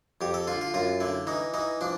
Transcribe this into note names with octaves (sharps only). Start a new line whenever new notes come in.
F2 G4
A4
D3 F4
F4
F#2 F4
D3 E4
E3 D#4
E3 D#4
F3 D4